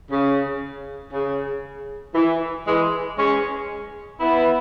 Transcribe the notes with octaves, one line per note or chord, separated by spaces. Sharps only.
C#3
C#3
E3
E3 G#3
G#3 C#4
B3 E4